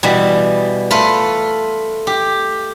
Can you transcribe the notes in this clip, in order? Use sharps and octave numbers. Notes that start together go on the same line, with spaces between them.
B2 E3 G3
A3 F4 B4
G4